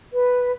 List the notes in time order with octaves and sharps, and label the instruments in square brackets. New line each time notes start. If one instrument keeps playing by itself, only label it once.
[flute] B4